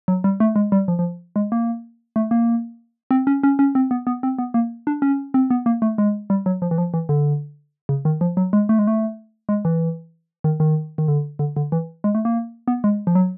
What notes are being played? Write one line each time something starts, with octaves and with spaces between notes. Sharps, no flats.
F#3
G3
A3
G#3
G3
F3
F3
G#3
A#3
A3
A#3
C4
C#4
C#4
C#4
C4
B3
B3
C4
B3
A#3
D4
C#4
C4
B3
A#3
A3
G#3
G3
F#3
F3
E3
F3
E3
D3
C#3
D#3
F3
F#3
G#3
A3
G#3
A3
G#3
E3
D#3
D#3
D#3
D3
D3
D3
E3
G#3
A3
A#3
B3
G#3
F3
F#3